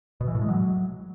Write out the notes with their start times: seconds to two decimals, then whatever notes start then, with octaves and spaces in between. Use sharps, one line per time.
0.21 B2
0.28 E3
0.35 A2
0.42 G#3
0.49 F#3